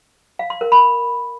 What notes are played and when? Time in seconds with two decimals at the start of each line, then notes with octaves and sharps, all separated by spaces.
0.39 F5
0.50 C6
0.61 A#4
0.72 B5